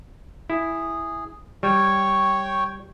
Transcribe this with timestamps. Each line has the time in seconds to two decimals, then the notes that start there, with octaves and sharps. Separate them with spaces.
0.50 E4 G#4
1.63 G3 C#5 G5 C#6